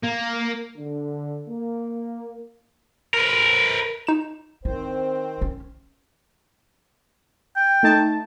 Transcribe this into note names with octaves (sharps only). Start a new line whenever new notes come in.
A#3
D3
A#3
A#4 B4
D#4 E7
D#3 C4 E4 C5
C#4
G5
A3 D#4 A5